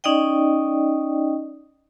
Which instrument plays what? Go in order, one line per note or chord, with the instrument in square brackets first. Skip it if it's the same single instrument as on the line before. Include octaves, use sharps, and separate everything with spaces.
[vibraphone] C#4 D#4 D5 D#5 G5